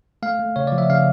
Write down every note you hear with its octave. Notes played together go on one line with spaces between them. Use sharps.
A3 F5
A3
C#3 C#5
D5
F3
E5
C#3 F5